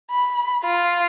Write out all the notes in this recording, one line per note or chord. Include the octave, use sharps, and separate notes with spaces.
B5
F4